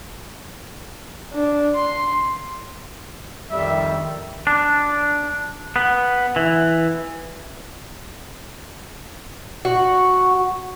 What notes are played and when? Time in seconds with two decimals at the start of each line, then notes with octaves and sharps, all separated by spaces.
1.33 D4
1.74 C6
3.51 F2 D#3 G3 E5
4.47 D4
5.76 B3
6.36 E3
9.65 F#4